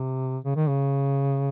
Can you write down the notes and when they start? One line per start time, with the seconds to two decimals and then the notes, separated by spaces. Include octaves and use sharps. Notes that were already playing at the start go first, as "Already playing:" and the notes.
Already playing: C3
0.45 C#3
0.56 D#3
0.68 C#3